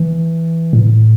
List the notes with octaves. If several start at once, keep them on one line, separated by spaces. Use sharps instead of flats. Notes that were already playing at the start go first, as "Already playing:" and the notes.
Already playing: E3
A2